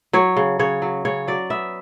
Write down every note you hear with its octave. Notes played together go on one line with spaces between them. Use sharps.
F#3 C#5
C#3
C#3 C#5
F#3
C#3 C#5
F#3 D5
B3 E5